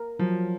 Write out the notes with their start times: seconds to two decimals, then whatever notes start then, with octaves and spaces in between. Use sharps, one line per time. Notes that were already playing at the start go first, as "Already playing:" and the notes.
Already playing: A#4
0.19 F3 F#3